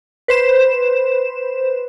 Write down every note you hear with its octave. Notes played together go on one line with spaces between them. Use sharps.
B4 C5 E7